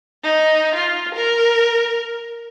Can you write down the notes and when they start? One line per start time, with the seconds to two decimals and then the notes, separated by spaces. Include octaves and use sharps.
0.23 D#4
0.75 F4
1.15 A#4